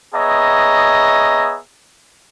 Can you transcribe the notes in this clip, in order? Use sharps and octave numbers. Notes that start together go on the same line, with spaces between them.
B3 G#4 C#5 D#5 E5 A#5